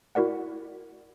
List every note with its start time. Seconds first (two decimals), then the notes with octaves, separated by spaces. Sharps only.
0.15 E4 F#4 A#4 D5 F#5